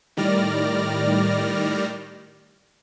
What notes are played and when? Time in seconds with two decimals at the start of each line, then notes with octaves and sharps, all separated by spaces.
0.17 A2 D#3 G3 D5 F6 A#6